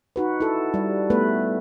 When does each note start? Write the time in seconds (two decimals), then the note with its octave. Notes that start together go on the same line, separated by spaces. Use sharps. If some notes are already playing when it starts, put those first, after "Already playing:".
0.16 D#4 F#4 B4
0.40 E4 A4
0.74 G3
1.10 A3 B3 B4